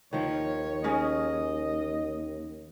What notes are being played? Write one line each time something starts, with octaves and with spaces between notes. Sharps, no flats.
D#2 D#3 F3 C#5
C#4 D#4 G#4 D#5